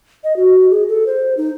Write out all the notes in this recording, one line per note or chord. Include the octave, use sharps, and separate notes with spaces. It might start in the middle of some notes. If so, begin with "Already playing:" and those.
D#5
F#4
G#4
A4
C5
D#4